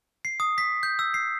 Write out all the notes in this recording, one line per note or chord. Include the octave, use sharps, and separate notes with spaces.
C7
D#6
B6
G6
E6
C7